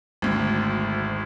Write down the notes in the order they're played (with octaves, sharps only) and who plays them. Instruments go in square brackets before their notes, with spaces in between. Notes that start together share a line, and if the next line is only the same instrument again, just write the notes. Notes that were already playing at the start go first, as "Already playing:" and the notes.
[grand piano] G#1 D2